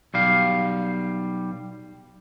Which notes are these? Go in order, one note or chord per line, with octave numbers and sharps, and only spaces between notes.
B1 G3 F5